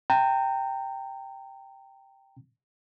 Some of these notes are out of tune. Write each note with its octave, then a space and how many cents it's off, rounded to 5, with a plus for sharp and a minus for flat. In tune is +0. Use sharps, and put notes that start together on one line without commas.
G5 +0 A#5 -30